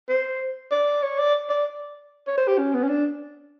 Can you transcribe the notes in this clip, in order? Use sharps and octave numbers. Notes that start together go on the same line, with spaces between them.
C5
D5
C#5
D5
D5
C#5
C5
G4
C#4
B3
C#4
D4